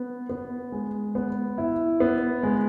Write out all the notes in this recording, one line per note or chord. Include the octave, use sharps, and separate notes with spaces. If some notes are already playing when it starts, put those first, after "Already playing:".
Already playing: B3
B3
G#3
B3
E4
B3
G#3